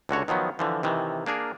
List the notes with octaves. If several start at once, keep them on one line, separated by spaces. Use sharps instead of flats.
C#2 D3 F#4 C#5
D#3 F3 F#3 B3
D3 E3 F3
C3 D#3 E3
A#3 D4 G#4 A#4